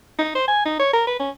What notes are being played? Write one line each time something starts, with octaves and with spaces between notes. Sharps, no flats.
D#4
C5
G#5
D#4
C#5
A#4
B4
C#4